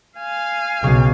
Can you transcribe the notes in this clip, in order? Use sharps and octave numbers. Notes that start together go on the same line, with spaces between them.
F5 G#5
B1 C#3